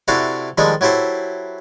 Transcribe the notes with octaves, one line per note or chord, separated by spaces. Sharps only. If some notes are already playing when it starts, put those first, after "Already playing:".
C3 D4 E4 F#4 A4 F5
D#3 F3 G3 G#3 D4 A4
F#3 E4 G4 A4 C5 E5